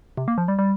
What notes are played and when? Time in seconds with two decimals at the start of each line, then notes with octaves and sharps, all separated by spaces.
0.17 C3
0.28 A#3
0.38 F3
0.48 G3
0.59 G3